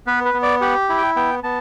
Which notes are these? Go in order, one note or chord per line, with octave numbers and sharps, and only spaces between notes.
B3 B4
B4
B3
D5
G4 F#5
E4
G5
B3 G5
B3 A5